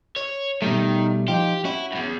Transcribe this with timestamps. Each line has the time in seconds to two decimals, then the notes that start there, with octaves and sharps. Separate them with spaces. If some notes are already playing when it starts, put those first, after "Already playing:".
0.16 C#5
0.62 B2 D#3 G3 A3
1.28 F3 D#4 F4 G4
1.65 C#4 E4 F#4
1.92 E2 G2